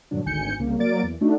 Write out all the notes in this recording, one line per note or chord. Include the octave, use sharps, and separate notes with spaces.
G2 A#2 D3 F#3 D4
G#1 D2 G#5 G6 C#7
C2 C#3 A#3
F#3 A#3 A#4 D5 A6 D7
E2
A3 D4 D#4 F#4